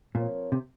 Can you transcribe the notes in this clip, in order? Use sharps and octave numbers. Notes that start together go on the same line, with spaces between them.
A#2 F3 C4 F4 A#4 C#5
C3